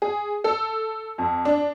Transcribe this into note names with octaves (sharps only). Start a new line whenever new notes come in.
G#4
A4
F2
D4